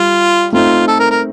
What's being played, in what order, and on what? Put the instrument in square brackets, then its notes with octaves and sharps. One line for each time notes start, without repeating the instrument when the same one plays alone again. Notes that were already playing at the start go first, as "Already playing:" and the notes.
Already playing: [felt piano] G3 [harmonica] F4
[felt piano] A3 C4 D#4 [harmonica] F4
[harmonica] A4
A#4
A#4